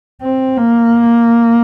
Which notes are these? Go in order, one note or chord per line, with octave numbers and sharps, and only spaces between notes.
C4
A#3